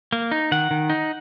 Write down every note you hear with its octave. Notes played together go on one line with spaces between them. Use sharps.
A#3
D#4
D#3 F#5
D#3
D#4